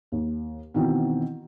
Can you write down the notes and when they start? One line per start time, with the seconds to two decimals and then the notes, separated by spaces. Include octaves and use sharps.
0.12 D#2
0.74 B2 D#3 E3 C4